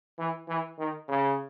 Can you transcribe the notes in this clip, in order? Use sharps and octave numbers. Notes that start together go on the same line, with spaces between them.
E3
E3
D#3
C#3